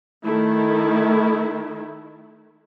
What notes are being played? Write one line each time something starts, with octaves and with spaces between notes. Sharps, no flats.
D#3 A3 E4